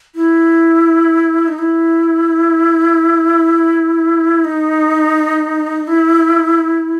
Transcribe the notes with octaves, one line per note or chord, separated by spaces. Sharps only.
E4
D#4
E4
D#4
E4